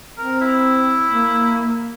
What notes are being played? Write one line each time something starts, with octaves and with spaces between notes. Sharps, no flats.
C4 A#4
E4
A#3